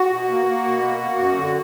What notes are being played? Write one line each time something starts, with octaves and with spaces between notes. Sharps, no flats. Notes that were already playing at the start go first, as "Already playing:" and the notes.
Already playing: F#4
B2
A#3
A#3
B2
A#3
A#3
F#2
D3